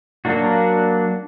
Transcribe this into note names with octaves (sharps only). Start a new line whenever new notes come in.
F#3 A#3 D4 F#4